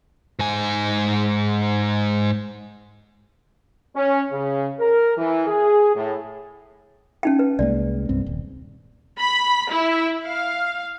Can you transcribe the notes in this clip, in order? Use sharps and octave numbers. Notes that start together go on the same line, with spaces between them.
G#2 G#5
C#4
C#3
A#4
E3
G#4
A2
C#4 D#4 G5
B4
C2 G#3 A#3 D5
C2 G2 C4
D#1
B5
E4
F5